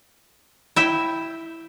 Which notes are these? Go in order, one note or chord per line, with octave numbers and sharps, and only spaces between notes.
E4 E5 G5